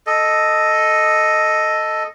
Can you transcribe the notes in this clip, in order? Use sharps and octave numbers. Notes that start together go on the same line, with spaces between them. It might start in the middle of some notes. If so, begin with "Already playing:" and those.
A4 D#5